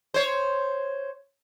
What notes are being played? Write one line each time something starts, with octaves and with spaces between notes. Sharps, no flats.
C5 C#5